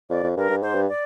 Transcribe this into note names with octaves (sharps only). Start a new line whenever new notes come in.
F2 D5
F2
G2 A#4
G2
G#2 C5
G2
D5